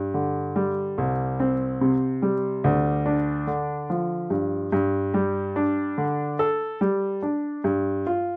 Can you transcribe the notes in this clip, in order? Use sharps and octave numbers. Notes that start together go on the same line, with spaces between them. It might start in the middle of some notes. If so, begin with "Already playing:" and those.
Already playing: G2
D3
G3
C2
C4
C3
G3
D2
D4
D3
F3
G2
G2
G3
D4
D3
A4
G3
D4
G2
F4